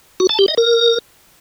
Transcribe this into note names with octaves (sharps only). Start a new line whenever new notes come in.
F#4
A5
G4
D#5
A#4